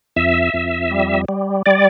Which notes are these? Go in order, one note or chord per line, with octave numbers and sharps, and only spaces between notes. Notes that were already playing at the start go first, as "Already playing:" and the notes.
F2 E5
F2
G3
G3
G3 D5